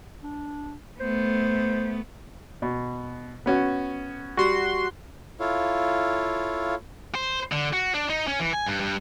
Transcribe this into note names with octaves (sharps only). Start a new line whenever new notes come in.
D4
A3 B3 C5
B2
B3 C#4 F#4
G3 F#4 C6
E4 F4 A4 C#5 F5
C5
D3
F#4
D4
D#4
C#4
E3
G#5
G2
G2